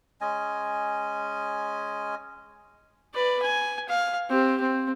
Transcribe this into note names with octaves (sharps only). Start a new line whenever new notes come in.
G#3 C#4 D#5 G#5
B4 D5
G#5
F5
C4 G4
C4